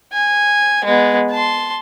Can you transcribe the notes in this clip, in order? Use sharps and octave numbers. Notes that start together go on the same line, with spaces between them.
G#5
G#3 B3
A5 C6